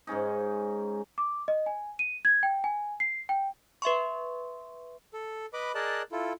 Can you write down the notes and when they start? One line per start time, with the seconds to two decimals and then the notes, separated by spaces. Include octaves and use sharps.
0.07 G#2 G#3 C#4 D#4
1.18 D6
1.48 D#5
1.66 G#5
1.99 D#7
2.25 G#6
2.43 G5
2.64 G#5
3.00 C7
3.29 G5
3.82 B4 E5 C6 C#6
5.14 A4
5.54 B4 D#5 B5 D6
5.75 G#4 A#4 D5 D#5 A5 F#6
6.12 E4 F4 A4